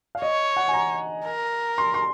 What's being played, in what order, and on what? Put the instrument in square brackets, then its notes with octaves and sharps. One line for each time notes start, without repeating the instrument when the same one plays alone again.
[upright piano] F5
[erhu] C#5 [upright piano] D#5
[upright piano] F#5
G#5
A#5
[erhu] A#4
[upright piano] C6
C6